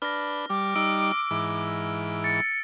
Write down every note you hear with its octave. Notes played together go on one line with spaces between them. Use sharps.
D4 B4 F6 A#6
G3 D6
G3 D#4 E6 D7
G#2 E3
A6 C#7